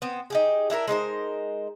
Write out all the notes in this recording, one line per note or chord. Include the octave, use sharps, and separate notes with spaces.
B3 C4
D#4 G4 G#4
D4 E4 G4 A#4
G#3 D#4 A#4 C5